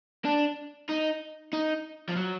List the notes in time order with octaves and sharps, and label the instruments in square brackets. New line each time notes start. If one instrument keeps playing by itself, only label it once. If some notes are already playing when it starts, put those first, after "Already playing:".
[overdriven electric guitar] D4
D#4
D#4
F3
F#3